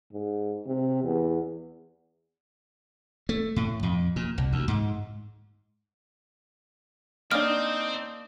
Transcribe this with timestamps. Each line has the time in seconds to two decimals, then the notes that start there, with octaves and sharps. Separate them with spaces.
0.13 G#2
0.66 C3
1.04 E2
3.29 A3
3.56 A2
3.83 F2
4.16 A#2
4.38 C2
4.53 D2
4.68 G#2
7.31 A#3 C4 D4 D#4 F6